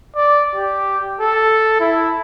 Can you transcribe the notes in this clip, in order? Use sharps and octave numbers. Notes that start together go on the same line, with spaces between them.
D5
G4
A4
E4